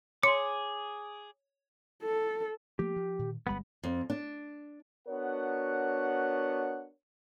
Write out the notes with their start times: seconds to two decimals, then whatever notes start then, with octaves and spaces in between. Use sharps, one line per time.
0.23 G#4 C#5 C6 D6 C#7
2.03 A4
2.79 F3 A3 A#3 G4
2.96 F3
3.19 A#2 D#3
3.47 G1 G3 G#3 B3 B5
3.83 F2
4.10 D4
5.08 B3 D4 F#4 A#4 C#5 F#5